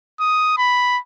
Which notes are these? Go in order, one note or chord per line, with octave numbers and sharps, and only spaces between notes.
D#6
B5